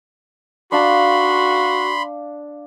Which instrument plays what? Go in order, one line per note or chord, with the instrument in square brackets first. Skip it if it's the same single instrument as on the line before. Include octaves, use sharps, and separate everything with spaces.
[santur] D4 F5 A5 [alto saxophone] F#4 [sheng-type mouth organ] B5 C6